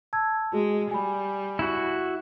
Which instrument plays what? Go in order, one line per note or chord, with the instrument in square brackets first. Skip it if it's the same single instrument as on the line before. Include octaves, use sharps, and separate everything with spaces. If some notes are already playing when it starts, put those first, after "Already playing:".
[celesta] A5 E6 G#6
[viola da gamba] G#3 [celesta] F#4 G#4
[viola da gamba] G3 [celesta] G#5 B5
[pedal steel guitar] E4 F#4